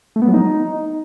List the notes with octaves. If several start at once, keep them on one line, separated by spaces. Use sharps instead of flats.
A3
B3
F#3
D#4